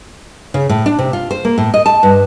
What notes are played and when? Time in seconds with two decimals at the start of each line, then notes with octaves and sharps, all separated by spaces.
0.54 C#3
0.69 A2
0.86 D4
0.99 C3
1.13 F4
1.31 C5
1.45 A#3
1.58 A2
1.74 D#5
1.86 A5
2.03 G2